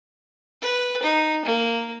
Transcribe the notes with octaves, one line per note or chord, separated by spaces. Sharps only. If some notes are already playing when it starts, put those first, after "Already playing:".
B4
D#4
A#3